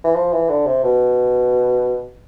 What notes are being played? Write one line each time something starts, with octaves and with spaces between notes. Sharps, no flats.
E3
F3
E3
D3
C3
B2